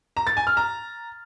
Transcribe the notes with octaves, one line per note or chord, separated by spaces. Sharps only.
A#5
A6
G#5
F6
A#5